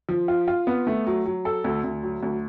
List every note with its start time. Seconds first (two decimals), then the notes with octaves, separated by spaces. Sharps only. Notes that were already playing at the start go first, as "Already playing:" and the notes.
0.09 F3
0.28 F4
0.48 F4
0.67 B3
0.87 A3
1.07 F#3
1.26 F#3
1.45 A4
1.64 D2
1.84 D2
2.03 F#3
2.23 D2